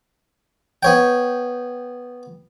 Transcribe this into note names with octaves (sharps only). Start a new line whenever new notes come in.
B3 C#5 G5